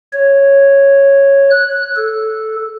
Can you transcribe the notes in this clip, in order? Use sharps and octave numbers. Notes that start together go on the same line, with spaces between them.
C#5
F#6
A4